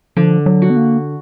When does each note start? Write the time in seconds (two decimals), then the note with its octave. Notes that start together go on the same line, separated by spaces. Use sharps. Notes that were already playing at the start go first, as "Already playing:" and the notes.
0.17 D3 F3
0.46 F#3
0.62 F#4
0.70 B3
0.76 A#3